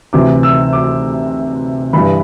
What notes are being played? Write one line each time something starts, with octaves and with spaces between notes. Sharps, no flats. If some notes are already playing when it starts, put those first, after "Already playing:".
D2 C3 E3 D6
E6
D6
G2 E3 B5